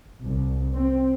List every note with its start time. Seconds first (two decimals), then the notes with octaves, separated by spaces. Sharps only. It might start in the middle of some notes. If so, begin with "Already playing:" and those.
0.24 C2
0.75 C4